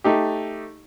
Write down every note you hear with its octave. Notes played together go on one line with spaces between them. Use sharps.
A3 D#4 G4